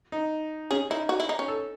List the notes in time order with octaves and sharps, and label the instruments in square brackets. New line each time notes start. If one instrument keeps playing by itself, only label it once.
[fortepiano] D#4
[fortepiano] C#4 [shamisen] G#4
[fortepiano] D#4 [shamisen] E4
[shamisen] F#4
E4
D#4
C#4
[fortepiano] A4